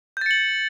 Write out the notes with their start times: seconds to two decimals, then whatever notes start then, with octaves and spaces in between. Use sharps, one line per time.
0.17 G6
0.21 A6
0.26 C#7
0.31 F#7